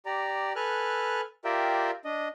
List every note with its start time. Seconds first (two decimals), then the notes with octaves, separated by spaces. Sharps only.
0.06 G4 D5 A#5
0.56 A4 B4 G#5 F6 F#6
1.45 F4 G4 A#4 D5 E5 G5
2.05 D4 D#5